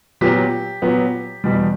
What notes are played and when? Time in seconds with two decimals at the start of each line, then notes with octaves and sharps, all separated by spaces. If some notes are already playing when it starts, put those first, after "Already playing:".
0.21 A#2 F#3 B3 G4
0.82 A#2 F#3 B3
1.44 E2 B2 G3